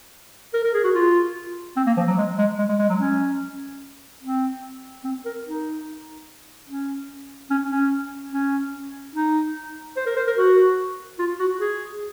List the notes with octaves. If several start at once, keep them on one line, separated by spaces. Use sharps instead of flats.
A#4
A#4
G#4
F#4
F4
C4
A#3
F3
F#3
G#3
G#3
G#3
G#3
G#3
F#3
C#4
C4
C4
A#4
D#4
C#4
C#4
C#4
C#4
D#4
C5
A#4
C5
A#4
F#4
F4
F#4
G#4